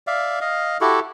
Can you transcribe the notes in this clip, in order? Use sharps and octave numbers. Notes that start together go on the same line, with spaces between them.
D5 E5 F5
D#5 F5
E4 F#4 G4 A4